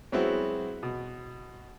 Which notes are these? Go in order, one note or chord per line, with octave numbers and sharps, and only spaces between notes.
F#3 G#3 B3 C4 E4 F#4
B2